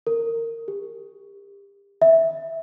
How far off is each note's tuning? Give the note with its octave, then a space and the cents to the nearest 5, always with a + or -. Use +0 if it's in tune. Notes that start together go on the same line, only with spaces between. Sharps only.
A#4 -20
G4 +35
E5 -10